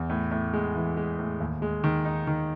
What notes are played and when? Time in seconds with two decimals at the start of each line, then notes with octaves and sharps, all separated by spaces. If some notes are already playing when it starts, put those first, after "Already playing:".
Already playing: E2
0.10 A2
0.31 A2
0.53 G#3
0.75 E3
0.97 G#3
1.19 A2
1.40 D#2
1.62 G#3
1.84 D#3
2.05 D#4
2.27 D#3